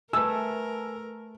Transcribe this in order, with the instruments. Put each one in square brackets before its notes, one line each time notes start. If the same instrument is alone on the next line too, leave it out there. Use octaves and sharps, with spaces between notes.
[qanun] A3 [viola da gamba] A#4 [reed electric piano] B4 G#5 [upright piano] E6